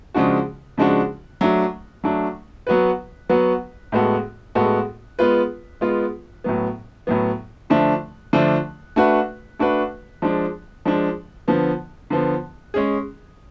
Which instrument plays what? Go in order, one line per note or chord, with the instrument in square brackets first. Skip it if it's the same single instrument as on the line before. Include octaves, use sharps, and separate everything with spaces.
[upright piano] C#3 F3 G#3 D4 F#4
C#3 F3 G#3 D4 F#4
F#3 A3 D4
F#3 A3 D4
F#3 B3 F#4 B4
F#3 B3 F#4 B4
A2 G#3 B3 F#4 A4
A2 G#3 B3 F#4 A4
G#3 B3 F4 B4
G#3 B3 F4 B4
A2 F#3 B3
A2 F#3 B3
D3 F3 A3 D4
D3 F3 A3 D4
A3 D4 F#4 B4
A3 D4 F#4 B4
F3 G#3 D4
F3 G#3 D4
D3 F3 B3
D3 F3 B3
G#3 C#4 G#4